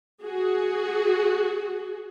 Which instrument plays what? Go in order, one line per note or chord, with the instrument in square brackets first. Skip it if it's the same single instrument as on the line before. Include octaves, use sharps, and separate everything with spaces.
[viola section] F#4 G#4